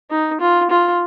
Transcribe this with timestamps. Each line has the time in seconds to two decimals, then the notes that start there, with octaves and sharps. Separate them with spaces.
0.10 D#4
0.40 F4
0.70 F4